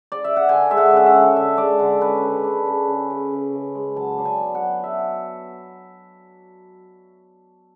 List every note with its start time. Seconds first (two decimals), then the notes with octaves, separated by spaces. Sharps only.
0.12 D5
0.24 E5
0.36 F#5
0.49 D3 G#5
0.70 G#3 E5
0.77 F#5
0.92 C#4 F#5
1.06 E5
1.14 D3
1.36 D3 E5
1.57 G#3 D5
1.79 D3
2.01 C#4 B4
2.23 C#3
2.44 D4
2.66 C#3
2.88 C#3
3.10 C#3
3.32 C#3
3.53 C#3
3.75 G#3
3.96 F#3 A5
4.18 D4
4.25 G#5
4.40 B3
4.55 F#5
4.62 F#3
4.83 F#3 E5